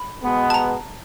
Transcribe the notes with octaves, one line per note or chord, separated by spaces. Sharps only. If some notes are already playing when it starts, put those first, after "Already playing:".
Already playing: B5
B2 G#3 B3
A5
A#5